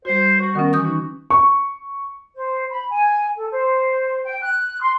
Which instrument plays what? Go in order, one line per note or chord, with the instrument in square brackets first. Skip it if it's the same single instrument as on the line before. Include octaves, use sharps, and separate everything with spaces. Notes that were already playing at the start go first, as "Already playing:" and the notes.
[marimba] G3 F#4 [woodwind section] C5
[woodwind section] F#4
[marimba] D#3 C#4 [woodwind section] B3 A#4
[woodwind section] E3 F#4 [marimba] D#6 G6
[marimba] D#4
[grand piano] C#6
[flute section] C5
B5
G#5
A4
C5
G5
F#6
C6